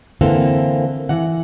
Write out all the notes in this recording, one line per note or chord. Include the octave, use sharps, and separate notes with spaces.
D3 E3 A#3 C4 A4
E3 F#5